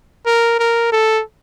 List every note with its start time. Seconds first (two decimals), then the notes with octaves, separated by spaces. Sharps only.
0.26 A#4
0.59 A#4
0.92 A4